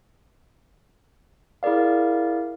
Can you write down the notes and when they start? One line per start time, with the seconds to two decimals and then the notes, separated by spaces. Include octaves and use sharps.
1.63 E4 G#4 A#4 D5 F5